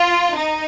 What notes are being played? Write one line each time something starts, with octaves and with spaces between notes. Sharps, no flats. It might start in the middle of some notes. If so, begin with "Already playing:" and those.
Already playing: F4
D#4